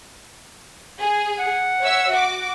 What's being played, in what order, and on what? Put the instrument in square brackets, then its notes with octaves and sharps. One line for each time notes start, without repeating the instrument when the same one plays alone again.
[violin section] G#4
[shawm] F#5
[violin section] C#5 E5 E6
F#4 D6